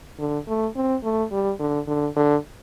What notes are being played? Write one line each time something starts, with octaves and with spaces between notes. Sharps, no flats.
D3
A3
C4
A3
G3
D3
D3
D3